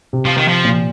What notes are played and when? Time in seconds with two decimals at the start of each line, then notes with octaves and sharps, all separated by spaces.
0.13 C3
0.25 F3
0.37 D#3
0.48 F3
0.65 A#2